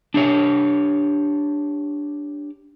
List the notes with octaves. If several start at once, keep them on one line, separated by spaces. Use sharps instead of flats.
D4 G4 C#5